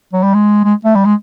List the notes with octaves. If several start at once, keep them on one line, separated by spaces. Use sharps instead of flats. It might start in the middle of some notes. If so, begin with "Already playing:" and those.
F#3
G3
G#3
G#3
A3
G3
G#3